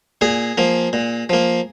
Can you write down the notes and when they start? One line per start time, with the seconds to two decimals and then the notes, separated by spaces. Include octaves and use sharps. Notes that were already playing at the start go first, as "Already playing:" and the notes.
0.21 A#2 G#4
0.58 F3 A#3
0.93 A#2
1.29 F3 A#3